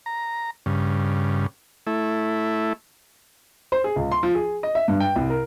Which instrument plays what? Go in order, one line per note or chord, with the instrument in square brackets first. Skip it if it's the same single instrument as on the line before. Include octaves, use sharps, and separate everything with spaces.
[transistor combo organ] A#5
G2 C#3
A3 E4
[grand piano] C5
G#4
C#2
C6
F3
G#4
D#5
E5
G2
G5
C2
A#4